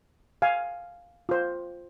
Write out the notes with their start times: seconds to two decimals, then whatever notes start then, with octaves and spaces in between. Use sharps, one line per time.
0.42 F5 G#5
1.29 F4 C5